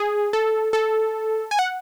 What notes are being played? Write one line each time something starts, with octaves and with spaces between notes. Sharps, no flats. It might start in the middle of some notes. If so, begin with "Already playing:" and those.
Already playing: G#4
A4
A4
G#5
F#5